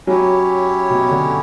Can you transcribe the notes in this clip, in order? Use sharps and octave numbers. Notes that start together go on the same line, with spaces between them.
F#3 C#4 E4 G4 C#5
B2
D3